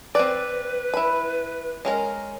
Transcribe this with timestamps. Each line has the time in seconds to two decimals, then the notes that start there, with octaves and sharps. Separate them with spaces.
0.15 C4 B4 D5
0.94 E4 B5
1.85 G#3 C#4 A#4